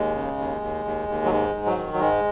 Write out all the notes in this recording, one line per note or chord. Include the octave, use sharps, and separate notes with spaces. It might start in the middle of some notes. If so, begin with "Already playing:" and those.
Already playing: D#2 G#3
C#3
D#2
D#2
D#2
D#2
F#3
G#2 G#3
G#2
F#3
D#3
F#3
G#2 G#3